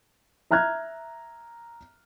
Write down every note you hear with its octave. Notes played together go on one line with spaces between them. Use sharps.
E5 A#5 F6 F#6 G#6